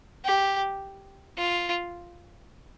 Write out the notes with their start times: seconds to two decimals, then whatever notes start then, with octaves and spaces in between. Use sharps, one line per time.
0.24 G4
1.37 F4